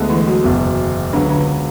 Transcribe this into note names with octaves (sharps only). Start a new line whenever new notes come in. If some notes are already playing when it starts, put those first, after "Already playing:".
Already playing: D2 D3 G#3 B3
E3 E4
F#3 F#4
F#1 E2 B2
C#2 B2 D3 F#3 D4
D3 D4